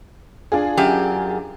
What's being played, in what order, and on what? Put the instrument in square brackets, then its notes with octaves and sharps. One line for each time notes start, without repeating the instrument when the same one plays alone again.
[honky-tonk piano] D4 F4 G#4
[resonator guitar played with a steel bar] F#2 G4